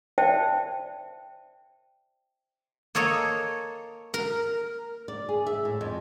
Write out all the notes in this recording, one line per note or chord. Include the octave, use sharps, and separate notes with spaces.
C5 D5 E5 G5 A5
A#3 A4 C#5 D#5
A#4
D5
G#4
E5
A2
F2